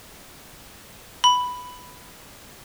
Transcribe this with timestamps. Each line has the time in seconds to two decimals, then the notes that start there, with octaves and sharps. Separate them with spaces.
1.24 B5